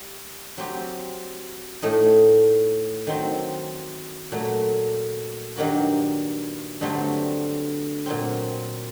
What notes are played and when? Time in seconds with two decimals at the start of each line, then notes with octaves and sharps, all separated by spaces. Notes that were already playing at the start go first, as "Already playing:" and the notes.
Already playing: G3
0.58 F#3 C4 G4
1.82 A2 A3 D#4
3.07 D#3 F#3 C4
4.32 A#2 F#3 A3
5.56 G2 D#3 F#3 A#3 F#4
6.81 G2 D3 F#3 A3 C4
8.06 A#2 F#3 C4